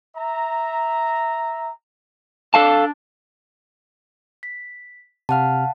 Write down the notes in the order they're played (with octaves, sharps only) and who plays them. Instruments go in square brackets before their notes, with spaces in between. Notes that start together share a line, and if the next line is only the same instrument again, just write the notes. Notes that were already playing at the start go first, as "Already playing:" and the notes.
[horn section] E5 A#5
[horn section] D4 [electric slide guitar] A4 F5 A5
[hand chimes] B6
[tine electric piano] C3 F6 [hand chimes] F5 F#5 A5